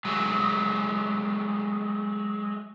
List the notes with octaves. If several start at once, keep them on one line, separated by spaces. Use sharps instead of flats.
F#3 G#3 A3